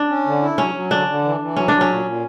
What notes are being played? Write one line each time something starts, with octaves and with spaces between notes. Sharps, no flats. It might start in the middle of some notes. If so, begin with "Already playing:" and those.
Already playing: D4
C#4
D3
E4
F#3 C#4
F#3
D3 D4
D3
E3
E3
F#3 C#4
F#3 D4
C#4
A#2
A#2